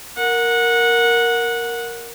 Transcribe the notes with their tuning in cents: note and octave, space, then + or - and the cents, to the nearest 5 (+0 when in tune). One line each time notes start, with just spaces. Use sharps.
A#4 +0 F#5 -15